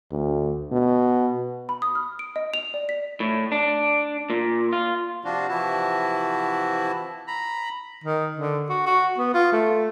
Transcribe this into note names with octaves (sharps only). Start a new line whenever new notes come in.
D2
B2
B5
D#6
F6
D7
D#5
F7
D5
B6
A2
D4
A#2
F4
C3 F3 D4 F4 F#4
C3 E3 F3 E4 F#4 A5
A#5 B5
D#3
D3
F#4
F#4
B3
F4
A3